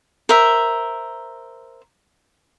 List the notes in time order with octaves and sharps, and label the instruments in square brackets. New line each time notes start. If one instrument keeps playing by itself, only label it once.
[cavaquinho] A#4 C5 E5